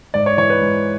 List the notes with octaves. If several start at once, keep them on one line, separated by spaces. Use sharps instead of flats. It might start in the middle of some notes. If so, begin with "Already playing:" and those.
G#2 D5
C#5
E3 C#5
B4
G#2